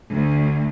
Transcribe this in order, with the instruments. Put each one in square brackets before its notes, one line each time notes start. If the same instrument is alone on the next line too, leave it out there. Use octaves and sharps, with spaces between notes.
[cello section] D2